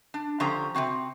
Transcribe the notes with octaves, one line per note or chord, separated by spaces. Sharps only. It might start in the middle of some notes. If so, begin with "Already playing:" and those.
D4
D3 F3 C#4 G4 C5 A#5
C3 D#3 C4 F#4